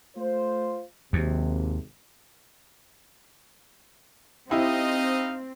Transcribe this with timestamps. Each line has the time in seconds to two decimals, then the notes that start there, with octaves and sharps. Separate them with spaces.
0.17 A3 F4 C5
1.13 G#1 D#2 C3
4.51 C4 D#4 E4 G4 D#5 F5